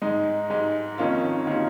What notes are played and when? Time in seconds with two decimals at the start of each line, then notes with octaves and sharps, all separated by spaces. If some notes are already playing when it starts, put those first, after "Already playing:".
0.02 G#2 G#3 D#4
0.50 G#2 G#3 D#4
0.98 F2 D#3 A#3 C#4 F4
1.47 D#3 A#3 C#4 F4